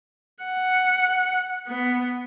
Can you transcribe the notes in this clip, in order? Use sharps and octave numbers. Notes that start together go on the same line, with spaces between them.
F#5
B3